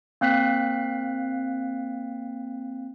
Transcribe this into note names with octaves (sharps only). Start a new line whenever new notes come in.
A#3 C4 F5 F#6 B6